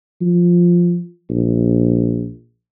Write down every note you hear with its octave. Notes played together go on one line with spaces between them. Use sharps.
F3
A#1